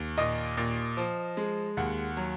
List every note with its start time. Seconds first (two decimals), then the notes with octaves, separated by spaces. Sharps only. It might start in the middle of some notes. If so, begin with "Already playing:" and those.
Already playing: D#2
0.18 A#2 D#5
0.57 A#2
0.97 F3
1.37 G#3
1.77 D#2 F#5
2.17 F#3